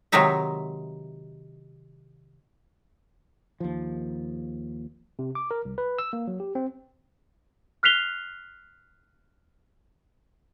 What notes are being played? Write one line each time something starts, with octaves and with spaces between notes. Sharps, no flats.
C3 D#3 F#3 G#3 D#4 E5
D#2 F3
C3
D6
A#4
C2
B4
E6
A#3
F#3
G4
C4
F6 F#6 B6 C7 F7 G7